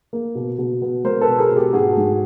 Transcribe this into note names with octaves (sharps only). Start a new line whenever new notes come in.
A#3
B2
B2
B3
G#3 A#4 C5
A4 B4
B2
G#4 A#4
B2
G4 A4
G#2 F#4 G#4
G#2